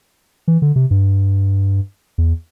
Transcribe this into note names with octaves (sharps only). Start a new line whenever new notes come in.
E3
D3
C3
G2
E2